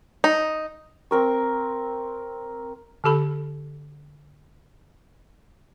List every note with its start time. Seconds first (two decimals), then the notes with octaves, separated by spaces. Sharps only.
0.24 D#4
1.11 C4 A#4 C#6
3.04 D3 G4 A4 B5